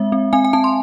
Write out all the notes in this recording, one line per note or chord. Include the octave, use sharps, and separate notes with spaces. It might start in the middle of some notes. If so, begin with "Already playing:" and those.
Already playing: G#3 C4 E5
C4
C4 G#5
G#5
C4 A5
C6